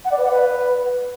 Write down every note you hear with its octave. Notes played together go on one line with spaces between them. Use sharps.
F#5
D5
B4
F#5
B4